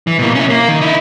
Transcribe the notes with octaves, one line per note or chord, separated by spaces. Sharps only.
E3
B2 A#3
C#4 E4
A#3
D#3
D#4 E4